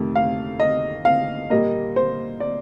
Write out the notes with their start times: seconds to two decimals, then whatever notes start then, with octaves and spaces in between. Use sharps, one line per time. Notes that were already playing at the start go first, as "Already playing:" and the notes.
Already playing: F2 C3 D#3 A3
0.16 F5
0.60 D#5
1.05 F5
1.50 A#2 G3 A#3 D#5
1.96 C5
2.40 D5